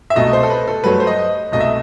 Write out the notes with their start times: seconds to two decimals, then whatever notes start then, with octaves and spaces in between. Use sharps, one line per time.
0.10 E5
0.16 C2 B2 A3 D#5
0.33 C5
0.43 A4
0.50 B4
0.68 A4
0.84 G2 F#3 A3 B4
1.00 C5
1.07 D#5
1.52 C2 B2 A3 D#5
1.60 E5